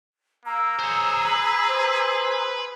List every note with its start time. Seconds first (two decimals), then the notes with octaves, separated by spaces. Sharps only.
0.45 A#3 A#5 E6
0.79 G#4 C5 C#5
1.25 B4
1.69 C5